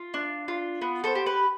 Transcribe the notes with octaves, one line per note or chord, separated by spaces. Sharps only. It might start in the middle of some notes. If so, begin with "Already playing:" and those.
Already playing: F4
D4
F4
B3
A4 C5
G4
B4